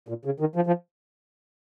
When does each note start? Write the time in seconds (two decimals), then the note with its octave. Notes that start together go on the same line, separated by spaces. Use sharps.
0.08 A#2
0.25 C#3
0.40 D#3
0.56 F3
0.67 F3